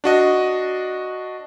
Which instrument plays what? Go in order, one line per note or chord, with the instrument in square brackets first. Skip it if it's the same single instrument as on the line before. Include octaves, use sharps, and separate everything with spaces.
[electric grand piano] D4 F#4 D#5